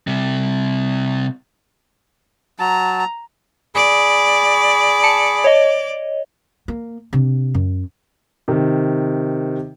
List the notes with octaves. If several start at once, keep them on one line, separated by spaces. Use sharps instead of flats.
C3 G3
F#3 A5 A#5
G#4 D5 B5
A5 C#7
C#5 D#5
A#3
C3 D4
F#2
C3 D#3